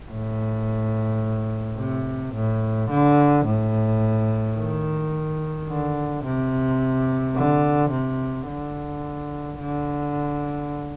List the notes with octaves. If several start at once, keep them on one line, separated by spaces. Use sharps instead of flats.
A2
C3
A2
D3
A2
D#3
D3
C3
D3
C3
D3
D3